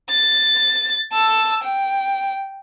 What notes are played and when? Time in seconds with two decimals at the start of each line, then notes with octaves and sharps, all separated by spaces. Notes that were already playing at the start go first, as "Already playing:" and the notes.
0.10 A6
1.12 A5 E6
1.63 G5